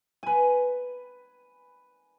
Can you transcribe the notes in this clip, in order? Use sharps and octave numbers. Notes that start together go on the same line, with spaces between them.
B4 G#5